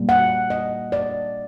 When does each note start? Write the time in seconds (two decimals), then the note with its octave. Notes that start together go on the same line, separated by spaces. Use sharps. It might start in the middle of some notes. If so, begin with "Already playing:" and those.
Already playing: A#2 G3 A#3
0.09 F#5
0.50 D#5
0.92 D5